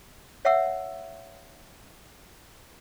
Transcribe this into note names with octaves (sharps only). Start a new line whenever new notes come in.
C#5 E5 F#5 E6